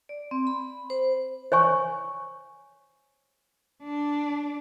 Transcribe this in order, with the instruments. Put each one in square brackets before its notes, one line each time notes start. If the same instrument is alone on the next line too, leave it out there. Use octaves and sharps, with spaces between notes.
[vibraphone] D5
C4
B5
C5
[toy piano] C5 C#5 G#5 C#6
[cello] D4